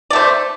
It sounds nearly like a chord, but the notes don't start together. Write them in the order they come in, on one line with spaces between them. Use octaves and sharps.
D5 A3 C5